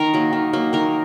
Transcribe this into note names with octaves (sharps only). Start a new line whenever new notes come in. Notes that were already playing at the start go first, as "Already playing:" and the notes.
Already playing: D#3 A#4
F#3 A#3
D#3
F#3 A#3
D#3 A#4